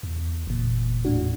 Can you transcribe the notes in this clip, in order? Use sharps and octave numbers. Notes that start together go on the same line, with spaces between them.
E2
F#1 E2 A#2
E2 A2 D4 F#4